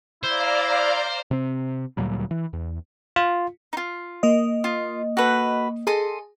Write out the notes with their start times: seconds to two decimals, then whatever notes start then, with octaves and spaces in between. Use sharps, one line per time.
0.24 E4 C5 D5 F5 A#5
1.31 C3 C4
1.97 D2 A#2 F#3 G3
2.31 E3
2.53 E2
3.16 F4
3.73 D#4 F4
4.23 A#3 D#5
4.64 F4
5.17 F#4 A4 B4
5.87 G#4 A4 D#5 C6